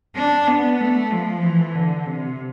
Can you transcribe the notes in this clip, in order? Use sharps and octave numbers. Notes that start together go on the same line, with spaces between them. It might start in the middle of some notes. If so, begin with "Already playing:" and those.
D4
B3
A3
F3
E3
D3
C3